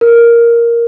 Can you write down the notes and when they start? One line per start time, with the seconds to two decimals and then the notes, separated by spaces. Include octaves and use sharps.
0.01 A#4